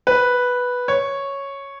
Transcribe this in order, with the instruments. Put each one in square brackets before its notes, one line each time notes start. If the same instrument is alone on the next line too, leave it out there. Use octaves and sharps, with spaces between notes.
[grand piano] B4
C#5